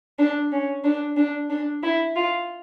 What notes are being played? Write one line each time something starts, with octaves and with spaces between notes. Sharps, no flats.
D4
C#4
D4
D4
D4
E4
F4